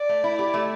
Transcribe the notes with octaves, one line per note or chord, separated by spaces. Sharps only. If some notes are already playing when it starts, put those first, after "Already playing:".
Already playing: D5
A3
E4
G4
A3